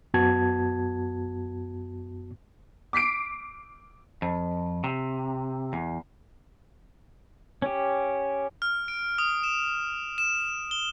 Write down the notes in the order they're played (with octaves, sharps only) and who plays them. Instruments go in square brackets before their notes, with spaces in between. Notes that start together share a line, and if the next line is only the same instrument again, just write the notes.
[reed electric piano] F#2 B3 F#4 A5 G#6
[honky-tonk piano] D6 B6 C7 D7
[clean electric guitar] F2
C3
E2
[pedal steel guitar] C#4 G4
[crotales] F6
D7
D#6
E7
E7
G7